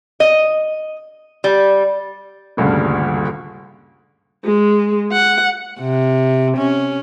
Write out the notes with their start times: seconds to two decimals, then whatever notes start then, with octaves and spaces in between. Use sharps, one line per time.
0.20 D#5
1.44 G3
2.57 D#1 D2 G2 C#3
4.45 G#3
5.12 F#5
5.80 C3
6.58 C#4